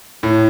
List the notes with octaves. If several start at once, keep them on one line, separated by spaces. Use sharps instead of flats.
A2